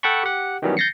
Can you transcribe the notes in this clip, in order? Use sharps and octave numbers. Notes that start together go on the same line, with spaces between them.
A4 F#5 G5 A5 B5 C#6
G4 F#5
D#3 E3 F#3 G3 B3 C#4
G6 A6 A#6 C7 C#7